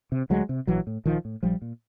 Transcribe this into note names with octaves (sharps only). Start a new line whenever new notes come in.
C3
D2 F#3 G#3
C3
A#1 E3 F#3
A2
A#1 D#3 F3
A2
A#1 F3 G3
A#2